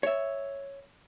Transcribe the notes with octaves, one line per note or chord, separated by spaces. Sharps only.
C#5 E5